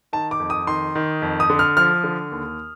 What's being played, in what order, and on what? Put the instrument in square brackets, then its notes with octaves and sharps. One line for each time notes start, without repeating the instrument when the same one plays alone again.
[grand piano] D#3 A5
D6
F2
D#6
D#3 C6
D#3
F2
D#6
D3
F6
F3 F6
D3
D#2